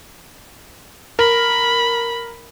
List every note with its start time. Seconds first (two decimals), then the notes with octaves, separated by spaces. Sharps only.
1.19 A#4 B5